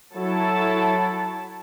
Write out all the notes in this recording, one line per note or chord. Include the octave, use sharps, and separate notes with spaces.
F#3 E4 A4 A5